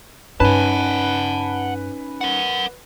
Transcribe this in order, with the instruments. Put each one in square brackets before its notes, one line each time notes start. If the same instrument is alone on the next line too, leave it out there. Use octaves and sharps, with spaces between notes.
[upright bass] G2 [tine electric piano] C#4 D#4 G#5 [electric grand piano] B4 [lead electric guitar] F#5 A5
[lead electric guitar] A#4 F#5